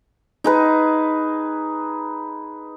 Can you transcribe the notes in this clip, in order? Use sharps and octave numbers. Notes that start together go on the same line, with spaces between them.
D#4 G#4 B4